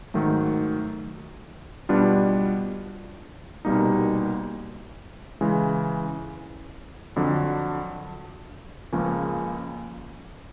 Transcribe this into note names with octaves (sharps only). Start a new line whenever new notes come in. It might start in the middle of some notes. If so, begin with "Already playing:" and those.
G#2 D#3 F#3 A3
B2 G3 B3 D4 F4
C2 B2 G3 A#3 D#4
C#3 E3 G#3
F2 D3 F#3
C#2 C#3 F3 A#3 C#4